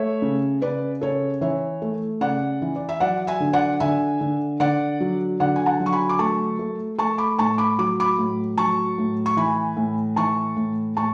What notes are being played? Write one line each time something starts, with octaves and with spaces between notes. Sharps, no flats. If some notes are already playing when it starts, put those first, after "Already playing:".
Already playing: A3 C#5 E5
C#3
C#3 B4 D5
C#3 A4 C#5
E3 C#5 E5
A3
C#3 D5 F#5
E3
D5
E5
F#3 D5 F#5
E5 G#5
D3
D5 F#5
D3 E5 G#5
D3
D3 D5 F#5
F#3
D3 D5 F#5
G#5
F#5 A5
F#3
C#6
G#5 B5
D6
A3 A5 C#6
A3
A3 A5 C#6
B5 D6
A2 A5 C#6
B5 D6
F#3 D6
B5 D6
A2
F#3 A5 C#6
A2
C#6
E3 G#5 B5
A2
E3 A5 C#6
A2
A2 A5 C#6